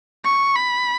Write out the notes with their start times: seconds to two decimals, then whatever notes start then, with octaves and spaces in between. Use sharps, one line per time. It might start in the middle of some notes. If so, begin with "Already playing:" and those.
0.24 C#6
0.56 B5